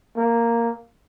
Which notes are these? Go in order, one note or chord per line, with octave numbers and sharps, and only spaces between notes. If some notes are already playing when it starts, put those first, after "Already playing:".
A#3